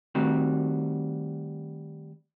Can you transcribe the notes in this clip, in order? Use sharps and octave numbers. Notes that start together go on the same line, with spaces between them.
D#3 G3 A3 C4 F#4